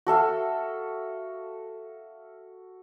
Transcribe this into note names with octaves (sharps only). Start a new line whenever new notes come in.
F#4 A4 E5 F5